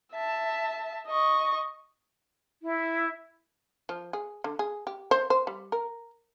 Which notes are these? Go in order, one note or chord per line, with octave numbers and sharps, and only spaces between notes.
E5 A5
D#5 C#6
E4
F3
G#4
D3
G#4
G4
C5
C5
G3
A#4